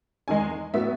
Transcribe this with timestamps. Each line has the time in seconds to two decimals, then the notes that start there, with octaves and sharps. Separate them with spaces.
0.28 E2 D#3 G#3 G#5
0.74 A2 F#3 B3 E5